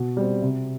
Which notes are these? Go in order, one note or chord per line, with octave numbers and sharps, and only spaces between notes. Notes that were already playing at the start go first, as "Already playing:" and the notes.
Already playing: B2 F#4
G3 C4
C3